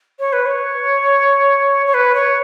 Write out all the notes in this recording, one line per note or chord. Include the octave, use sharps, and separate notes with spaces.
C#5
B4
C#5
C#5
B4
C#5